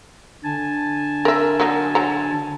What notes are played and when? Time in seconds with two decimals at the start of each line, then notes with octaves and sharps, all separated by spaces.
0.44 D3 G#5 A5
1.25 A#4 E5
1.60 F#3 A#3 D#4
1.95 F#3 A#5